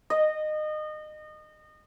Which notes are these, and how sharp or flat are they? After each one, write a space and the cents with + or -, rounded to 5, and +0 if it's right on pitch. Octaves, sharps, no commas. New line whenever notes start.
D#5 -25